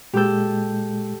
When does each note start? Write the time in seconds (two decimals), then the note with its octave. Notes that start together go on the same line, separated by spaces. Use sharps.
0.13 A#2 G#3 G4 A4 G6